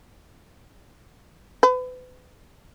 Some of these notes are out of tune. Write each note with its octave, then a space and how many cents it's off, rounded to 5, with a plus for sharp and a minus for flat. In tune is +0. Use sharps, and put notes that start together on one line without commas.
B4 +35